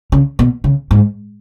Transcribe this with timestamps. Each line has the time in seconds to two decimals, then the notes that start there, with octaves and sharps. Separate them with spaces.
0.12 C#3
0.39 B2
0.64 C#3
0.91 G#2